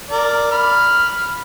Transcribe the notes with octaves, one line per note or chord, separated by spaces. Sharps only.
A#4 D5
B5 F6